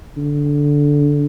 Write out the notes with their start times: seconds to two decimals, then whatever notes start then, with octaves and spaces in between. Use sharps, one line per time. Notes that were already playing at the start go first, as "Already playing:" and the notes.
0.17 D3